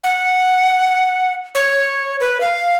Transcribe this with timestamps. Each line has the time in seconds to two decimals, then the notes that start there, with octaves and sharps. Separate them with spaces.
0.04 F#5
1.55 C#5
2.20 B4
2.41 F5